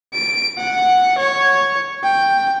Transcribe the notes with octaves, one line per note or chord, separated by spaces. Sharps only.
D7
F#5
C#5
G5